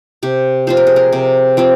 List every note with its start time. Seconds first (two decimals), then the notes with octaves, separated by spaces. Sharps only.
0.23 C3 G4
0.67 F3 C4 F4 C5
0.77 A#4
0.87 G#4
0.96 A#4
1.13 C3
1.57 F3 C4 F4